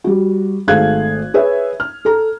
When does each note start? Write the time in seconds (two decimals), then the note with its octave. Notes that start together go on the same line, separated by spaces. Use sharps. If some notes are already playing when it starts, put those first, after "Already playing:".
0.04 G3 F#4
0.68 G#1 A3 G#4 F5 F#6 G#6
1.34 G#4 B4 C#5 E5
1.80 F6
2.05 A4 A#5